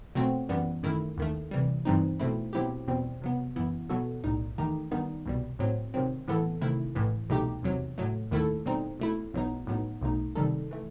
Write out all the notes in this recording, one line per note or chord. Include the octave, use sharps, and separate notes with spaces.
B2 F#3 A3 C4 F#4
F#2 E3 G3 B3
F#2 D#3 A3 E4
D#2 D#3 A3
C3 E3 G3
G2 E3 G3 C4 D#4
B2 A3 C4 E4
B2 F#3 C4 E4 G4
E2 B2 G3 C4
C3 F#3 B3
F#2 E3 B3 E4
B2 F#3 B3 F#4 A4
B1 A2 G3 D#4
E2 D#3 A3 D#4 G4
G2 D#3 G3 B3 D#4
C2 B2 G3
A2 F#3 C4
C3 D#3 F#3 C4
A2 E3 B3 E4 A4
C3 D#3 A3 E4
A1 A2 E3
C2 B2 A3 D#4 G4
E2 C3 F#3
A2 F#3 A3
D#2 D#3 A3 E4 A4
B2 G3 C4 D#4
B2 A3 E4
B1 B2 F#3 B3 D#4
A2 F#3 B3 D#4
B1 B2 A3 D#4
C3 D#3 G3 D#4 A4
E3 A3